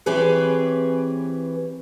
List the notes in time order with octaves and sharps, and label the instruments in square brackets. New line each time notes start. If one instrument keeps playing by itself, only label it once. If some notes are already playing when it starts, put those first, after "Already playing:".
[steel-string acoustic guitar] E3 C4 G4 G#4 B4 C#5